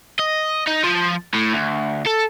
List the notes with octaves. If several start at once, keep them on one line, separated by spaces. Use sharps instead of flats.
D#5
D#4
F3
A2
D2
A4